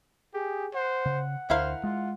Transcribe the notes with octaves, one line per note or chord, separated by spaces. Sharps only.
G4 G#4
C5 F#5
C#3
D2 E4 A#4 C5 F5
G#3 F4